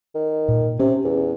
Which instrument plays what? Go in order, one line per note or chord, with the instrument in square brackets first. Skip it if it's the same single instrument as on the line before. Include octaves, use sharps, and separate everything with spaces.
[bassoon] D#3
[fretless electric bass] A#2
[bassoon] C3 [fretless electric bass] C#4
[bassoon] E2